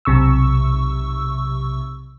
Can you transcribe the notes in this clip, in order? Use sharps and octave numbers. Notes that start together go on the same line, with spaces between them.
B1 C3 C#6 E6